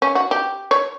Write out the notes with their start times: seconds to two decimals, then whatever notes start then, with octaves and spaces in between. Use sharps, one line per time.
0.02 C#4
0.15 F#4
0.31 G4
0.71 C#5